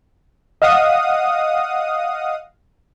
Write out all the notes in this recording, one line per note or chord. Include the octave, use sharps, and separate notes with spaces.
D#5 F5 F#5 D#6